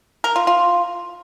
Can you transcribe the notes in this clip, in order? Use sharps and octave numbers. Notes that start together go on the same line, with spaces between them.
A#4
F4
F4